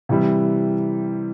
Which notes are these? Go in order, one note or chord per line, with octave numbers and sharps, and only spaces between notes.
C3 E3 G3